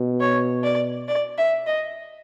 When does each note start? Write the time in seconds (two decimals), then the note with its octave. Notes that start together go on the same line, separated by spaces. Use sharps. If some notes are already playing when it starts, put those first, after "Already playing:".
Already playing: B2
0.20 C#5
0.64 D5
1.08 D5
1.38 E5
1.67 D#5